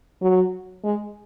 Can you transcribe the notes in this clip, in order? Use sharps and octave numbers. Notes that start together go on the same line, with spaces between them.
F#3
G#3